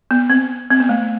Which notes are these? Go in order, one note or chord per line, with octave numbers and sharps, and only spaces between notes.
B3
C4
C4
B3
A3